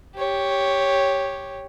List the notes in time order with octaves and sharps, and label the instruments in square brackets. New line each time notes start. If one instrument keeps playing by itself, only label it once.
[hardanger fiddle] G4 C#5